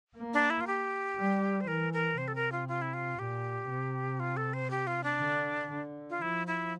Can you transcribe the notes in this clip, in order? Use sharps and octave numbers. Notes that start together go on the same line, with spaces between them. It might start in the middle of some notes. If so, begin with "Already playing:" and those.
A#3
D4
E4
F4
G4
G3
C5
E3 A#4
A#4
C3 C5
A4
A#4
F4
F4
E4
F4
A#2 G4
C3
F4
A4
C5
G4
F4
D4
D3
D3
F4
F3 E4
E4